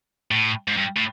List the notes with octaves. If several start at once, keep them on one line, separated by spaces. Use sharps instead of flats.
A2
G#2
G2
A2